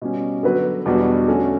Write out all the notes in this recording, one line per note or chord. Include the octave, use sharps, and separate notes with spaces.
B2 G3 C#4
D3 F#3 B3 F#4 B4
E2 B2 G3 D4 F#4
D3 A3 C#4 F#4